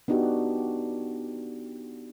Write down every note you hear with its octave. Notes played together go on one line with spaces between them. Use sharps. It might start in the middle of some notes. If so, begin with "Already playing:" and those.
B3 D4 D#4 F#4 G4